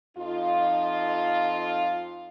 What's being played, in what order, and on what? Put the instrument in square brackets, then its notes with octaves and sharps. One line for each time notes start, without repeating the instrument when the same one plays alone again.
[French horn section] F2 D#4 F4